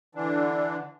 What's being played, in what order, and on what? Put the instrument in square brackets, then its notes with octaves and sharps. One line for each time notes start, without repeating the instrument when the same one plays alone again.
[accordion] D3 E3 D4